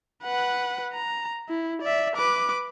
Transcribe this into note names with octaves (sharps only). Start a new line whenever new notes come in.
B4 F#5
A#5
E4
D5 E5
B4 D6